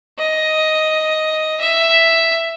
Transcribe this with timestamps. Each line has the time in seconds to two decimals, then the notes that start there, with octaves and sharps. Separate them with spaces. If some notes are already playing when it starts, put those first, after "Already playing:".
0.19 D#5
1.61 E5